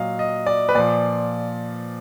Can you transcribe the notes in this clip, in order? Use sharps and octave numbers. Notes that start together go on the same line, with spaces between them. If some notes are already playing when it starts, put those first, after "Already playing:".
Already playing: A#2 F#3 D#5 F5
D#5
D5
B4
A#2 F3 D5